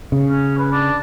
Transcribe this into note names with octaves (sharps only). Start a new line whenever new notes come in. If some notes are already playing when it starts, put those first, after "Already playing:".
C#3
C#4
B4
D4